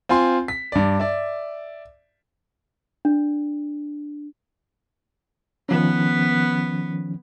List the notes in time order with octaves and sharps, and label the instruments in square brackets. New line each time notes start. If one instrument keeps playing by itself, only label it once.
[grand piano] C4 F4 G#5 C6
B6
G2 D5
D5 E5
[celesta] D4
[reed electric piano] D#3 F3 C#4 [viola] B3 B4